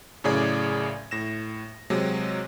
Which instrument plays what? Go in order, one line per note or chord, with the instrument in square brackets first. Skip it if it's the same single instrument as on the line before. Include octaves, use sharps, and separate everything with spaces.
[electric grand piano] F#2 A2 C#3 G#4 D5 G#6
A2 A#6 E7
C3 F#3 G#3